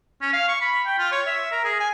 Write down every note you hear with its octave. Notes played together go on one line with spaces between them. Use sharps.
C#4
F5
C#6
B5
G5
F4
C#5
E5
A#4
G#4
G#5